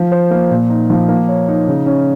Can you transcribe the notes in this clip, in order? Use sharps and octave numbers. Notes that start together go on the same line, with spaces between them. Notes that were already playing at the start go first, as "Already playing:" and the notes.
Already playing: F3
C5
A#3
A#2
D#4
F3
A#3
C#5
D#4
C#3
C#4